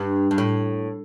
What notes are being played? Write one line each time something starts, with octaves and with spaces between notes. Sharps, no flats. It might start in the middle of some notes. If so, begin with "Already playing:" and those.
Already playing: G2
G2
A2